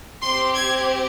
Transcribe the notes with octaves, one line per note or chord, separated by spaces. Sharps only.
C4 G4 C6
G#6